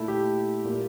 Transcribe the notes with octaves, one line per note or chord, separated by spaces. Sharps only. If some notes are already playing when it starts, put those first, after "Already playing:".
Already playing: A#2 A3 E4
G4
A#2 G3 A#3